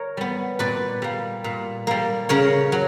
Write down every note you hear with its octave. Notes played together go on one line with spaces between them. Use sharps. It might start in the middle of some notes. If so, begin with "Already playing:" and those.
Already playing: A#4 C#5
G3 B3
A#2 B4 D5
G3 A#3
A#2
G3 A#3
C#3 A#4 C#5
F#3